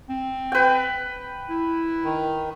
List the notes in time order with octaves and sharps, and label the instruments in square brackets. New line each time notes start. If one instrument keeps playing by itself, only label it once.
[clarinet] C4
[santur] B4 G5
[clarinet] E4
[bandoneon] D#3